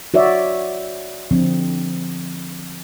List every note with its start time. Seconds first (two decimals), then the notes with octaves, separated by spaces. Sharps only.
0.14 F#4 C#5 D5 E5
1.31 D3 F3 C4